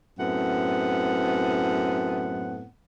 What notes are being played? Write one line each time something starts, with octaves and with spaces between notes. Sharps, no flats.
F#2 A2 B3 C4 F#5